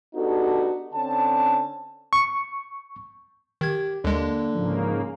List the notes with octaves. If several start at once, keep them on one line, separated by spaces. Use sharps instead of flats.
B3 D4 D#4 F#4 G4 A4
D3 C4 C#4 A5
C#6
D#3 G4 G#6
D#2 D3 G#3 A#3
G#2 C#3 F3 A#3